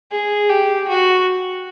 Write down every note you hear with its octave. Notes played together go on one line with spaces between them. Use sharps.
G#4
G4
F#4